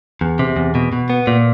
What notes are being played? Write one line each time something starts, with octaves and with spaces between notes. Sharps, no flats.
E2
C3
E2
B2
B2
B3
A#2